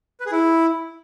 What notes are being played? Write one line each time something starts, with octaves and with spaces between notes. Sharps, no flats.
B4
G#4
E4